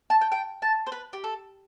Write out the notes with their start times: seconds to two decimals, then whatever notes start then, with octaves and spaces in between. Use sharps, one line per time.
0.10 A5
0.21 G5
0.32 G5
0.62 A5
0.87 C5
0.92 B4
1.13 G4
1.24 A4